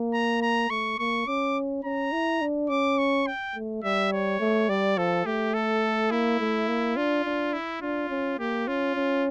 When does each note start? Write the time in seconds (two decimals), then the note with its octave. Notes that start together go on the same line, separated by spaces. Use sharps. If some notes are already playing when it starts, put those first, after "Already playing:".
Already playing: A#3
0.13 A#5
0.42 A#5
0.70 A3 C#6
0.99 A#3 C#6
1.27 C#4 D6
1.84 C#4 A#5
2.12 E4
2.41 D4
2.69 C#4 D6
2.98 C#6
3.27 G5
3.55 A3
3.83 G3 E5
4.12 C#5
4.40 A3
4.69 G3 D5
4.97 F3 A4
5.26 A3 G4
5.54 A4
6.11 A#3 E4
6.40 A3
6.68 A#3
6.96 D4 F4
7.25 D4
7.53 E4
7.81 D4 F4
8.10 C#4
8.39 A#3 G4
8.67 C#4 F4
8.96 C#4